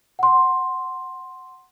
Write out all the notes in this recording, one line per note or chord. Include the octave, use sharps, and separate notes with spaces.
F#5 C6